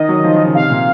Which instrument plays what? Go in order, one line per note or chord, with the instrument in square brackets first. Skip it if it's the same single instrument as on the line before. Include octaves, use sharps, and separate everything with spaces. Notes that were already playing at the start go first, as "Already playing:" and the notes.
Already playing: [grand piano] D#3 [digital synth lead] D#5
[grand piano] F#3
D#3
F3
D#3
C#3
[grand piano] C3 [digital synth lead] F5
[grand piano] A#2